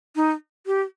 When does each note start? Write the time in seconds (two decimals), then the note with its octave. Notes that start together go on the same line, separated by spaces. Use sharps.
0.16 D#4
0.66 G4